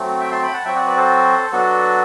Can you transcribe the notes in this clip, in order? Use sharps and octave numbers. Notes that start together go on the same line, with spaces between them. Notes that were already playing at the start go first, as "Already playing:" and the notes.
Already playing: F#3 A3 C4
E5 G5
A5 C6
G5 B5
F#5 A5
F#3 C4 F#4 E5 G5
D5 F#5
B4 D5
A4 C5
F#3 B3 D4 F#4 A4